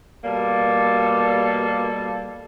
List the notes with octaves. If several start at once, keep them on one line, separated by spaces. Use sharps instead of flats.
B2 G3 A#3 A4